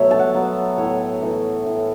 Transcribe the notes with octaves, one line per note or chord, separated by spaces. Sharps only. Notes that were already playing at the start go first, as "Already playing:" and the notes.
Already playing: B2 F#3 A3 C#5 E5
A5
F#5
F#3 B3
A2 C#5
E3 A3
A2